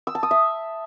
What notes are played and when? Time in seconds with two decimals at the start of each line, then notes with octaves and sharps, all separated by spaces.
0.07 E6
0.15 A5
0.23 D#6
0.31 E5